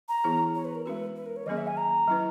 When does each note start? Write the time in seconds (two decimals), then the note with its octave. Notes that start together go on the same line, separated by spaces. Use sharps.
0.09 A#5
0.24 E3 B3 E4 G#4
0.55 C#5
0.65 B4
0.75 A#4
0.85 G#3 C#4 F#4 B4
1.16 B4
1.26 A#4
1.36 C#5
1.46 D#3 F#3 A#3 C#4 G#4 D#5
1.57 E5
1.67 G#5
1.77 A#5
2.08 F#3 C#4 E4 B4